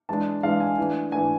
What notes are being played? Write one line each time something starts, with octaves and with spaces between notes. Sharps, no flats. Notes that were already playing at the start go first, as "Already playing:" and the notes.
E3 G#3 D4 A5
E3 G#3 D4 F5
G#5
E3 A3 D4
E3 A3 D4 G#5